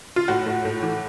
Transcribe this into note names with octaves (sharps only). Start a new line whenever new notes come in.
F4
A2 F#4
A2
A2
E3